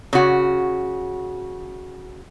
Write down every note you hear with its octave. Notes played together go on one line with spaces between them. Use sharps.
C#3 F#4